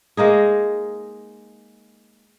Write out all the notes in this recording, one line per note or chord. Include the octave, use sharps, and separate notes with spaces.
G#3 A#3 D#4 G#4